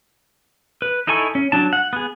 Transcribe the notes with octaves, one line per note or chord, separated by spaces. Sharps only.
B4
D#4 E4 A4 G#5 C#6
C#4
F#3 D4 A5
F#5
B3 G#4